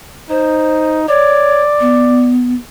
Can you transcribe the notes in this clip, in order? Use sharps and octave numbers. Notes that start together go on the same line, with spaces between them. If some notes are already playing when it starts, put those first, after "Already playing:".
D#4 C5
C#5 D5
B3